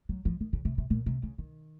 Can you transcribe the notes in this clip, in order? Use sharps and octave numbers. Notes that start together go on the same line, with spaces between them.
F#3
F3
D#3
C#3
C3
C3
A#2
C3
C#3
D#3